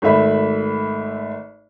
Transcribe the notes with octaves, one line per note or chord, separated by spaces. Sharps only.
G#1 A3 E5 B5